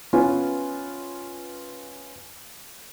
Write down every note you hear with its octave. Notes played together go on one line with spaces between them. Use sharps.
B3 C#4 F4 B4